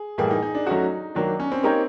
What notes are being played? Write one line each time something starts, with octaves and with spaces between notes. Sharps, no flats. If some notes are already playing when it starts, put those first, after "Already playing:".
Already playing: G#4
A2 E3 G3 A#3 G#4
D#4
D#4
D4
F#3 A3 C#4 D#4 F#4
D#3 F#3 A#3 D4
C#4
C4
A#3 D#4 G4 A#4 C#5